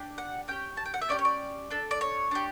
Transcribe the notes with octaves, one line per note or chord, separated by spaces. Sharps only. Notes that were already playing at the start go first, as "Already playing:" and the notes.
Already playing: D4 G4
F#5
C#4 G4 G5
A5
G5
F#5
E5
C#4 E4 G4 D5
C#5
D5
D4 A4
D5
C#5
D4 G4